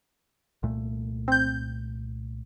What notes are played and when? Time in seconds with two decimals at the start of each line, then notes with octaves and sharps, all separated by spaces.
0.63 C2 A#2 A3
1.28 C4 G6